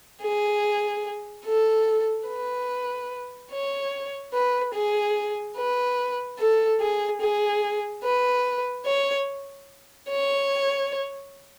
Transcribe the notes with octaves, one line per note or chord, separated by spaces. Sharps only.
G#4
A4
B4
C#5
B4
G#4
B4
A4
G#4
G#4
B4
C#5
C#5